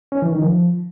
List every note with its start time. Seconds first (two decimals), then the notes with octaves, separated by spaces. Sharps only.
0.12 C#4
0.22 E3
0.32 D#3
0.42 F3